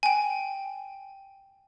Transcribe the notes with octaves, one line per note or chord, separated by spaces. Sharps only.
G5 G#5